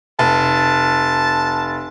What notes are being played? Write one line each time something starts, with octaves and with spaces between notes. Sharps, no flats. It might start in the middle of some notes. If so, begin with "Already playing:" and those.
F1 A5